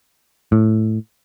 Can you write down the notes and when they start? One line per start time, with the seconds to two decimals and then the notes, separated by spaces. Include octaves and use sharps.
0.52 A2